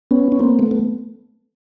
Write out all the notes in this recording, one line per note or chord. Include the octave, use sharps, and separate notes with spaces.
B3 C#4
C#4
A#3 C4
A3 B3
B3